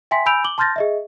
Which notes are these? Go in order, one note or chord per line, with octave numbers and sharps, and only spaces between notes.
E5 G5 G#5 C6 B6
G#5 B5 E6 G6 D7 F7
D6 F#7 G7
A5 C6 F6 G6 A6 A#6
G#4 D#5 E5